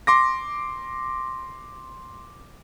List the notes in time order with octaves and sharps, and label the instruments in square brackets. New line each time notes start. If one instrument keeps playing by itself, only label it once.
[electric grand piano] C6 D6 A#6